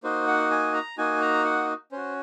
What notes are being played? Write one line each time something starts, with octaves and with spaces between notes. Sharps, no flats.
A#3 D#4 F#4 C5
F#5
G#5
A#5
A#3 D#4 F#4 G#5
A#5
F#5
C#4 F#4 C5